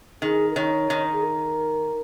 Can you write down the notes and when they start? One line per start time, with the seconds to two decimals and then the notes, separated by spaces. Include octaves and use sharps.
0.22 D#3 G#4
0.51 A#4
0.56 D#3 C#5
0.90 D#3
1.13 G#4
1.23 A#4